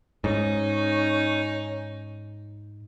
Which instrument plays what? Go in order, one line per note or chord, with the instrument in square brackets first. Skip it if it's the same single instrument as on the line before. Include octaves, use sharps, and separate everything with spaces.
[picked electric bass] G#2 [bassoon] C#4 [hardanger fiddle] D#4